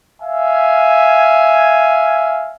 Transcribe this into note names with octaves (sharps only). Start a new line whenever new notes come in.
E5 F5 G#5